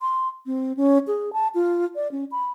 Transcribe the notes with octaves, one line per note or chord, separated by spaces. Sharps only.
C6
C4
C#4
G#4
A5
F4
D5
C#4
B5